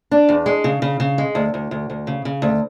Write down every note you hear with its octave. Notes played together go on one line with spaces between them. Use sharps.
D4
E2
G#3
C#3
C#3
C#3
G#3
D2
D2
D2
D2
C#3
C#3
D2